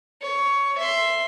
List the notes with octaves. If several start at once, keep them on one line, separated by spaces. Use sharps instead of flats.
C#5
E5 C6